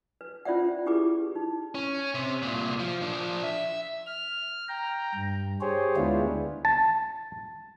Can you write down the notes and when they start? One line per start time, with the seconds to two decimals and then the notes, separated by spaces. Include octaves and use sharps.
0.21 B4
0.45 C#4 F4 C5 D5 E5 F#5
0.86 E4 G4 G#4 B4 D6
1.36 D#4
1.75 C#4
2.15 C3
2.42 C2 A#2
2.79 F3
3.02 F3 D4
3.43 E5
4.06 F6
4.68 G5 A#5
5.15 G2
5.61 G4 G#4 C5 C#5
5.96 D2 G#3 B3 D4 E4 F4
6.65 A5